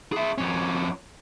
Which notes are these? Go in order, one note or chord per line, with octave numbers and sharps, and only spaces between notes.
G#4 E5
F2 C#4